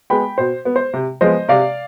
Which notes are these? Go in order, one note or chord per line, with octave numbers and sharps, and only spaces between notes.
G#3 B3 G5 B5
B2 C5
B3
C5
C3
F3 G#3 B3 C5 D#5
C3 D5 F5